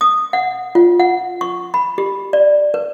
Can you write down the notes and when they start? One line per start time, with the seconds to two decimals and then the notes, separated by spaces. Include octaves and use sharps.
0.01 D#6
0.33 F#5
0.75 F4
1.00 F#5
1.41 C#6
1.74 B5
1.98 G4
2.33 D5
2.74 B4